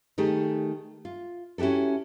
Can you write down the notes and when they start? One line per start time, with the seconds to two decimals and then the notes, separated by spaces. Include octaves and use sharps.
0.18 D#3 A3 G4 G#4
1.05 F4
1.58 C#4 E4 F#4 G4 A4